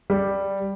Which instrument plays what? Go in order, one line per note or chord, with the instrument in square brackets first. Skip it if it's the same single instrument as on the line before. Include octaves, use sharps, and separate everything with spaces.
[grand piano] G3